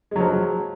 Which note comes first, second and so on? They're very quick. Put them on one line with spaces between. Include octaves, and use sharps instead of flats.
G#3 F#3 F3